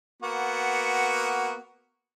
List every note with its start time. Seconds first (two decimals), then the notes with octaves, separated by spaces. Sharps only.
0.23 A#3 B3 F#4